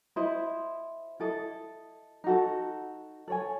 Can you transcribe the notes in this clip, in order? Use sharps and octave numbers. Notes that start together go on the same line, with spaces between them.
E4 C5 D#5
E4 A4 D#5
D#4 F#4 A4
A4 C#5 G#5